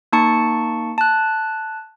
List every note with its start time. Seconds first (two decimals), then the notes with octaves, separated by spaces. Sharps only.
0.13 A#3 D#4 A5 C#6 C#7
0.98 A5 F#6